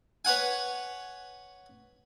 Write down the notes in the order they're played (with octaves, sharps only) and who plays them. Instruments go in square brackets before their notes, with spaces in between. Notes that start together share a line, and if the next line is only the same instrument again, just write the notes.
[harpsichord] B4 C#5 F#5 G#5